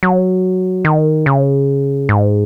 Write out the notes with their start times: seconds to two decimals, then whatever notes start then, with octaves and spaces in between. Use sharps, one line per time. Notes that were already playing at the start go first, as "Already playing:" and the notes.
0.03 F#3
0.85 D#3
1.26 C#3
2.09 G#2